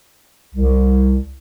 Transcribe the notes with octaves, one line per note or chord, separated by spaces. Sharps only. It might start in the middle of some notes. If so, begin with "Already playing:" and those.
C2